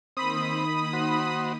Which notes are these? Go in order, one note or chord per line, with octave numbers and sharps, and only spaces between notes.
D#3 A#3 C4 D#4 B5 D#6
F#4 C5